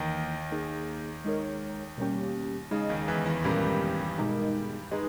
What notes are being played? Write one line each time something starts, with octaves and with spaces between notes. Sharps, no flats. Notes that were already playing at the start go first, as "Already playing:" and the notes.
Already playing: D#2 D#3 E3 A#3 D#4
A#3 D#4 G#4
G#3 D#4 A#4 C#5
B2 G3 A#3 C#4 G4
C#3 G#3 D#4 G#4 D#5
D#2 D#3
E2 E3
E2 E3
G2 A#2 G3 G#3 C#4 G4 A#4
B2 G#3 D#4 A#4
G#3 D#4 G#4 B4 D#5